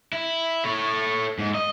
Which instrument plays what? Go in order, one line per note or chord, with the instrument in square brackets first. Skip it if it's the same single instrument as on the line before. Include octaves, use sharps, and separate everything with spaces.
[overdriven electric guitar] E4
A4 C#5
G#2
D#5